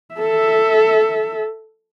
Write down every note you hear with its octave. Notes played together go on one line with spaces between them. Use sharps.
A4 E5